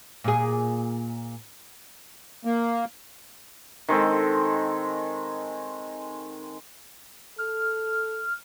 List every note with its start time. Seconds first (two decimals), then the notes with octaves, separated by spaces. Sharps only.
0.24 A#2 G#4
2.45 A#3
3.89 D#3 G#3 C4 A4
7.38 A4 F6